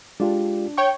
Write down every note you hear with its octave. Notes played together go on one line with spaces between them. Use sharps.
G#3 D4 F4 G4
C#5 G5 C#6